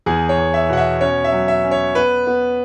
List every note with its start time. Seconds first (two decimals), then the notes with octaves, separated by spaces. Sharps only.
0.06 E2 G#4
0.29 C#5
0.38 E2
0.54 E5
0.69 B2 F#5
0.77 E5
1.01 C#4 C#5
1.24 E5
1.32 F#3
1.48 E5
1.64 C#4
1.71 C#5
1.95 B3 B4
2.27 B3